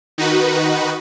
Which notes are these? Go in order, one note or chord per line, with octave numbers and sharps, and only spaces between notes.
D#3 D#4 F#4 B4